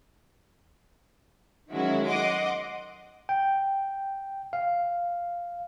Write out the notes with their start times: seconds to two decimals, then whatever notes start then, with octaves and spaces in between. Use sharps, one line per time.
1.71 D#3 F#3 G#3 C#4 E4 F#4
2.08 D#5 F#5 C6 D6
3.29 G5
4.53 F5